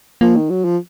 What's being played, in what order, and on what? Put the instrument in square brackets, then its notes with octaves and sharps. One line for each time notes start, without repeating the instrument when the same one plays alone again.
[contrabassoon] F3 [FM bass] A#3
[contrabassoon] D#3
F#3
F3